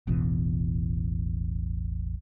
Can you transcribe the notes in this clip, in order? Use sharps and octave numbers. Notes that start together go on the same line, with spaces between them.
E1 A1 B2 E3